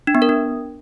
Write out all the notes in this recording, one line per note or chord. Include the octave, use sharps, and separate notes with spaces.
D4
B3
A#4
D4